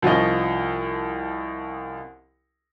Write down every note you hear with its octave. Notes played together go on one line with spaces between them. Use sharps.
C2 F3 C#4 D#5